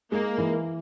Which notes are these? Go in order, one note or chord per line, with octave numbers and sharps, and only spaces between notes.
G#3 A#3
E3